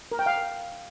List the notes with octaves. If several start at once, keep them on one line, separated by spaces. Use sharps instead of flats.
A#4
G5
F5